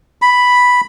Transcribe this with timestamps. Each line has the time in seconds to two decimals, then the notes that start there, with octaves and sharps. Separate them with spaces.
0.22 B5